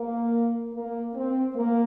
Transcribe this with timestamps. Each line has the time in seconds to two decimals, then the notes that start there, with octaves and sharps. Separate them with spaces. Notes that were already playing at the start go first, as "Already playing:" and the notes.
Already playing: A#3
0.74 A#3
1.14 C4
1.55 A#3